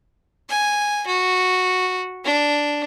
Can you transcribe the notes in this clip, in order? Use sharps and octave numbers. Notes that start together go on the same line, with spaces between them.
G#5
F#4
D4